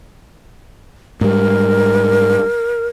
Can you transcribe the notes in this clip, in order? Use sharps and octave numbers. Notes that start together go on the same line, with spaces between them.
G#2 G3 A#4